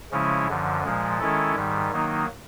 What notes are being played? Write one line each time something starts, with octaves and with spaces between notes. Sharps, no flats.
C#3 F3 G#3 C#4 E4
F#2 D3 F3
A#2 F3 G#3
D#3 G#3 C#4 E4 A4
G#2 D#3 G3
D#3 F#3 A#3 D#4